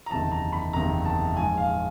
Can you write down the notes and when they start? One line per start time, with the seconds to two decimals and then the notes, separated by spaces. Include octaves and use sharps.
0.06 A#5
0.11 F#1 E2 C3 D#3 A5
0.31 A#5
0.53 B5
0.73 F#1 E2 C3 D#3 A#5
1.05 A5
1.36 A#1 G#2 F3 G#5
1.57 F5